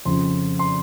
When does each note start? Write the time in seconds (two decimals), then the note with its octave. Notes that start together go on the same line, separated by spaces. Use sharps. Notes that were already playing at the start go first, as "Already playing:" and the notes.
0.05 F2 C#3 F3 C6
0.59 C6